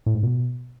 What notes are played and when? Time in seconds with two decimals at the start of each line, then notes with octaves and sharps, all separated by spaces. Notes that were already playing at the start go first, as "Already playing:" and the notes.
0.06 A2
0.15 G#2
0.23 B2